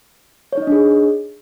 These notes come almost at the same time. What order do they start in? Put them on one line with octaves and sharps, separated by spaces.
C#5 D#4 D#5 D4 G#4